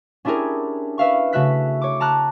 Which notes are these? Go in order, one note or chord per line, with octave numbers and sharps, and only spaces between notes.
C#4 D4 E4 G4 G#4 A#4
B4 E5 F5 C#6
C#3 A3 F#4 E5 F#6 B6
C#5 D6
A5 A#5 F6 F#6